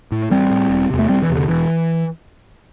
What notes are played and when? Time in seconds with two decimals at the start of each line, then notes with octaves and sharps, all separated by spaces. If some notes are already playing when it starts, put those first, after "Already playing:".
0.12 A2
0.31 A1 G3 C4
0.51 A2
0.70 E1
0.90 E2 C3
0.99 A3
1.09 E1 G3 C4
1.23 E3
1.29 E2 C3
1.36 D3
1.48 E1 E3